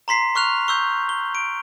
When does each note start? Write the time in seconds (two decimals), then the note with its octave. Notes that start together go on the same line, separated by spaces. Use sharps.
0.08 A#5 C6 B6 C7
0.35 C#6 F6 F#6 F7
0.68 C#6 E6 G6
1.09 G7
1.35 D7